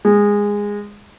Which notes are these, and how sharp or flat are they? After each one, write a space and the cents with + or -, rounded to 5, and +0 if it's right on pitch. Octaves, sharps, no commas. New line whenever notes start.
G#3 -15